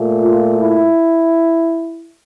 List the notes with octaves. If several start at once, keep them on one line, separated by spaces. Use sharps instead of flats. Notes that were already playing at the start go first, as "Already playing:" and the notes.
Already playing: A#2 A3
F4
E4